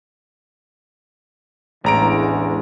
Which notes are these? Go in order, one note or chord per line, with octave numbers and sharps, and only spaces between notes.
A1 E2 D3 G#3 A#5 D7